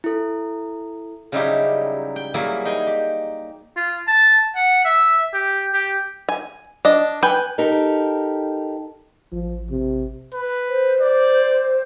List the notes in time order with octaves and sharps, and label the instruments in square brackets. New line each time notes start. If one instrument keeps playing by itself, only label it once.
[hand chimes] E4 A4
[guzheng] C#3 F#3 G3 D#4 E4 G4
G5
E3 F#3 G3 A#3 E4 G#4
D#4 G#4 G5 G#5
G4
[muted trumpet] F4
A5
F#5
E5
G4
G4
[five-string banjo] G#5
D4 D#5
B4 G5 G#5
[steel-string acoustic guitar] D#4 G4 A4 A#4
[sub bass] A1 [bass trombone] F3
[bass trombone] C3
[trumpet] B4
[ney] C5
[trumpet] D5